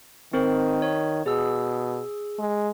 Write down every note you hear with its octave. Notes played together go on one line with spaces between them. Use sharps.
D#3 C4 A#4 C5
C#5
B2 G#4 E6
G#3